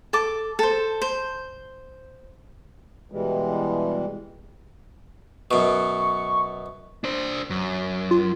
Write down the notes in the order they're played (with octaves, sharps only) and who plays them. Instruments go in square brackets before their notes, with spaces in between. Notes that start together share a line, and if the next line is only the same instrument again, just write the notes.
[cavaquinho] A4 D6
A4 C5
C5
[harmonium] B2 E3 G3 G#3
[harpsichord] F#2 B2 [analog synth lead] C#6
[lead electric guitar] D4 C5
F#2
[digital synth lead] F4